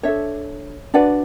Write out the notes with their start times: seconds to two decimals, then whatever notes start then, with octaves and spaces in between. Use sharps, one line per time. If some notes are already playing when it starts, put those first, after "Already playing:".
0.03 D4 A4 C#5 E5
0.94 D4 F#4 B4 D5 F#5